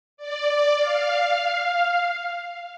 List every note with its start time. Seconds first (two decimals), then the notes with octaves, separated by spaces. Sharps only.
0.17 D5
0.78 F5